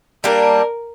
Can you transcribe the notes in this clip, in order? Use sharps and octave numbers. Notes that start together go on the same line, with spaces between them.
G3 A#3 D4 A#4